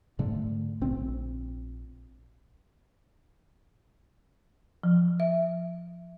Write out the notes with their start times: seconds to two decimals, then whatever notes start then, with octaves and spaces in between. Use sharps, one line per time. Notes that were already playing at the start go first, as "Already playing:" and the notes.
0.19 G#2 D3 A3
0.81 A#1 C4
4.83 F3
5.20 E5